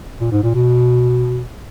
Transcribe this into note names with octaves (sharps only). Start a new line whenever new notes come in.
A#2
G#2
A#2
B2